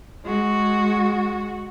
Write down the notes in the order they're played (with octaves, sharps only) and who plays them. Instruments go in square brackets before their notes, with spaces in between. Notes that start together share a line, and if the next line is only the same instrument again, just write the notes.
[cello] G#3 F#4